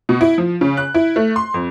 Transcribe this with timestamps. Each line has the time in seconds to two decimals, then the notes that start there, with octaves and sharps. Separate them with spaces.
0.09 B2
0.21 E4
0.38 F3
0.61 C#3
0.77 F#6
0.94 E4
1.16 A3
1.36 C6
1.54 F2